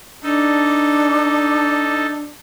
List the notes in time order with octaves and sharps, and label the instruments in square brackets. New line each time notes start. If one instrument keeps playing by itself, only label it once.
[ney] D4 [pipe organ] D#4 A4